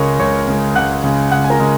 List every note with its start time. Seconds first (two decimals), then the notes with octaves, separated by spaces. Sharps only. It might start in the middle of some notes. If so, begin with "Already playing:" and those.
Already playing: C#2 C#3 G#3 A#4 C#5 C#6
0.20 C#2 C#5 C#6
0.48 C#3 G#3
0.76 C#2 F#5 F#6
1.04 C#3 G#3
1.31 C#2 F#5 F#6
1.44 G#5
1.50 A#4 A#5
1.60 C#3 G#3